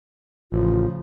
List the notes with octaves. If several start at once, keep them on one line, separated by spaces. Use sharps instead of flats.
A1 C#3 F3 F4